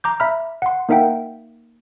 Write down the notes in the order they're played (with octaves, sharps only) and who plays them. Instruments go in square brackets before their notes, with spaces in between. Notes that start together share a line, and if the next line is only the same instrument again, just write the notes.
[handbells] A#5 D6 G6
E5 A#5 B5 F6
F#5 C6
A#3 D#4 A#4 E5 F#5 G5